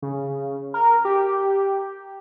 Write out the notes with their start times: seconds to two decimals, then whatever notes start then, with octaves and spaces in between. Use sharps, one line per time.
0.02 C#3
0.74 A#4
1.05 G4